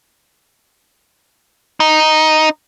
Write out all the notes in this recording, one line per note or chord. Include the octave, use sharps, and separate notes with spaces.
D#4